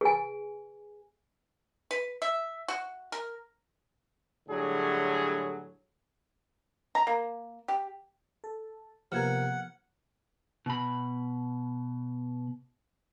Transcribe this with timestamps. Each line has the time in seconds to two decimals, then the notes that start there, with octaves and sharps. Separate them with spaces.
0.01 G#4 G#5
1.91 B4
2.22 E5
2.68 F#4
3.12 A#4
4.49 A2 D3 F#3 G3 G#4
6.95 A#5
7.07 A#3
7.68 G4
8.44 A4
9.12 C3 F3 A#3 B3 A#4 F#5 F6 G#6
10.66 B2 B5